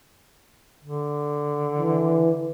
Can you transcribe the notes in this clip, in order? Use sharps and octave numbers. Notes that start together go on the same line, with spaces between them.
D3
E3